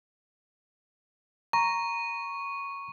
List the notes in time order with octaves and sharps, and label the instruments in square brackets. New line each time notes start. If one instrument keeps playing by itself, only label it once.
[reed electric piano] A#5 [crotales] C#6